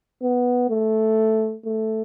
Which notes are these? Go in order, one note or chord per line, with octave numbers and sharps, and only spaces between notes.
B3
A3
A3